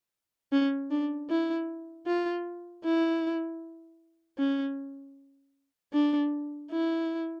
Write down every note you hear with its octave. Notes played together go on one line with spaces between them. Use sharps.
C#4
D4
E4
F4
E4
C#4
D4
E4